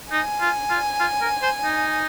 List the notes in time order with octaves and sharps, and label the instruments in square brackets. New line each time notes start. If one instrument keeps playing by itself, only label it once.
[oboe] D#4 [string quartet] G#5
[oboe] F4
F4
F4
A#4
C5
D#4